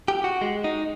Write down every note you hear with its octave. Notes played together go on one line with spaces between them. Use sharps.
G4
F#4
G#3
D#4